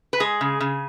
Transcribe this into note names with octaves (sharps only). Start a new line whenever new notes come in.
B4
G#3 G#4
C#3
C#3